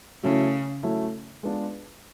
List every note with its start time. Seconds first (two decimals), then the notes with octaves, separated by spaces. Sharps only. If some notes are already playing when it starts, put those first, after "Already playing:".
0.23 C#3 F#3 A3 C#4 E4
0.83 F#3 A3 C#4 E4
1.43 G#3 B3 D4 F4